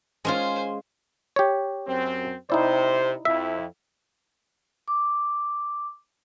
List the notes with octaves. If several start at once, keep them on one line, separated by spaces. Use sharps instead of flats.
G#3 C#4 F4 C5 G#5
G4 C#5
F#2 C4
C3 D#4 E4 C5 D5
F2 E4 E5
D6